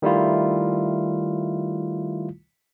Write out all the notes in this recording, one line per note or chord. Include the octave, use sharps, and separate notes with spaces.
D#3 G3 A3 E4 F4